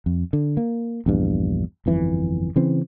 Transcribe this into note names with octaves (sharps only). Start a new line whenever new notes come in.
F2
D3
A#3
A#1 E2 G2
G1 F2 E3
C#3 E3 C4